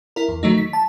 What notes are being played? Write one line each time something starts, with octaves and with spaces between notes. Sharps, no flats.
E4 A#4
E2
D#3 F#3 A3 D#4
B6
A5